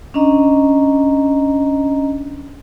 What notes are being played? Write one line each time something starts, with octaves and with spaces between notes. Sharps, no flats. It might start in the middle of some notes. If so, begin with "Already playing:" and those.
C#4 D4 D#5 A#5